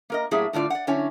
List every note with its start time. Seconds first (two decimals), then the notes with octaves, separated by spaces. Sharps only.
0.10 A#3 A#4 D#5
0.31 A2 F#3 A#3 G4 G#4 E5
0.53 A2 D3 F4 D5
0.70 D5 F#5
0.87 D3 F#3 C#4 E4 C#5 G#5